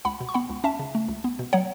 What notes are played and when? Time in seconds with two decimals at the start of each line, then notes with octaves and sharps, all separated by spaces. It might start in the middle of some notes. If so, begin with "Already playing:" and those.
0.05 C#2 F#5 B5
0.20 B2
0.29 C#6
0.34 B3 F#5 B5
0.50 C#2
0.64 C#4 E5 A5
0.79 C#3
0.95 A3
1.08 C#2
1.24 B3
1.39 B2
1.53 F#3 C#5 F#5